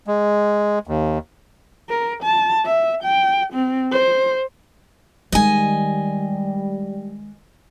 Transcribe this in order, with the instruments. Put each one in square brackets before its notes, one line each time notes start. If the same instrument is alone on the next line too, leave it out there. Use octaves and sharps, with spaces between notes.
[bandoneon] G#3
D#2
[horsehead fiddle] A#4
A5
E5
G5
C4
C5
[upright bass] D#3 G#3 [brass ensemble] G3 [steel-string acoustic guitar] D#5 G#5